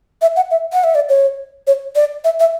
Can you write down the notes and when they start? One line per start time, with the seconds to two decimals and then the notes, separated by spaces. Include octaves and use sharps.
0.22 E5
0.36 F#5
0.51 E5
0.73 F#5
0.84 E5
0.95 D5
1.09 C#5
1.67 C#5
1.96 D5
2.24 E5
2.40 E5